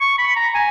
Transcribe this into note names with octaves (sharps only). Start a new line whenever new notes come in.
C#6
B5
A#5
G#5